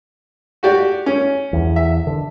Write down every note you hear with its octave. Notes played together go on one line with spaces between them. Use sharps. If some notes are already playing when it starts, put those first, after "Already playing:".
F#4 G4 D5
C#4
E2
E5
D3